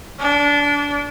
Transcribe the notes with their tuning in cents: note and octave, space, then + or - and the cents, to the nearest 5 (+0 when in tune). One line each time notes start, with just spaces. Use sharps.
D4 -25